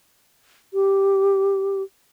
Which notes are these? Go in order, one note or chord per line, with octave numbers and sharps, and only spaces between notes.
G4